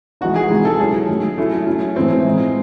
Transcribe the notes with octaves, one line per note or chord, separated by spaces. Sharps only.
E3 G#3 D#4 F#4
G#4
C3 E3 G#3 D#4
A4
F#3 C#4 E4 G#4
D#3 F#3 A3
F#3 A3 C#4 E4
F#3 C#4 E4
A2 E3 G#3 C4 C#4 E4
E3 G#3 D#4